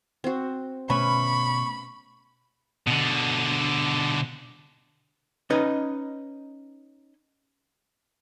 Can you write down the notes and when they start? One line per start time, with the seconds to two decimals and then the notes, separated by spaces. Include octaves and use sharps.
0.24 C4 F#4
0.90 B2 A3 B3 C#4 B4 E5 B5 C#6
2.87 B2 D3
5.50 C#4 D#4 B4 D#5